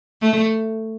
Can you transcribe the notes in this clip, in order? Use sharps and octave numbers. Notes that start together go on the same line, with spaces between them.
A3